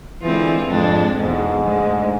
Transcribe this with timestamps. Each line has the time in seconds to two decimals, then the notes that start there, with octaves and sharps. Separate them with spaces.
0.23 D3 E3 G#3 C4 F4
0.70 F2 G#2 G#3 D4
1.17 E2 G#2 B2 G#3
1.65 D2 D3 G#3